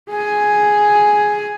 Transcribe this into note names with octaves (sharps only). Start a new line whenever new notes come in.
G#4 G#5